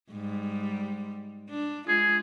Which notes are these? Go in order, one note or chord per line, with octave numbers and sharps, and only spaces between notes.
G#2 G3
D4
G#3 F4 G#4